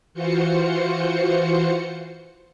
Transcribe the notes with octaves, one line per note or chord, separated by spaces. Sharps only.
E3 F4 F#4 C5 C#7